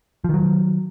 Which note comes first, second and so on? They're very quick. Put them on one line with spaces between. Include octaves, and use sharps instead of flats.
F3 D#3 F#3